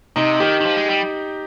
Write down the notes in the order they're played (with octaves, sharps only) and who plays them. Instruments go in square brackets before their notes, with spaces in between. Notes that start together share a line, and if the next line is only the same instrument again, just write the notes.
[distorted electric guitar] C3 [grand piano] D#4
[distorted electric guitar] D#3 [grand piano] G4
[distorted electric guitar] D#3
F3
G#3
G3